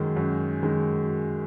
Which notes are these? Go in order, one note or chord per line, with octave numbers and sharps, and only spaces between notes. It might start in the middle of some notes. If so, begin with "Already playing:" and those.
Already playing: F#2 D#3 G#3
F#2
D#3 G#3